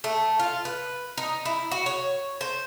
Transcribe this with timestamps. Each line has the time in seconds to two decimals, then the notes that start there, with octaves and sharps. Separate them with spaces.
0.04 A3
0.39 F4
0.65 B4
1.17 D#4
1.45 E4
1.71 F#4
1.86 C#5
2.41 C5